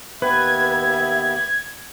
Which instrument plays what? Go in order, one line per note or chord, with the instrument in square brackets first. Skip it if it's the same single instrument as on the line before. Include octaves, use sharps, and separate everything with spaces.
[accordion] D#2 B3 G4 [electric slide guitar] B4 [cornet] E5 [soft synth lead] G#6